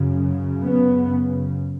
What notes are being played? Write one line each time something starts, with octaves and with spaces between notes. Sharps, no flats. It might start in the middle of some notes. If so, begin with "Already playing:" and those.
Already playing: F#2 C#3
B3